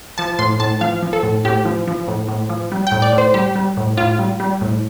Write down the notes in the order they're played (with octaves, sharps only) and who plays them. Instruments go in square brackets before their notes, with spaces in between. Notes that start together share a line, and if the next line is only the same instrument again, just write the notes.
[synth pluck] F3 A5
A2 C6
A2 A5
F3 F5
F3
A4
A2
A2 G4
F3
F3
A2
A2
F3
G3
A2 G5
D5
A2
C5
G3 G4
G3
A2
A2 F4
G3
G3
A2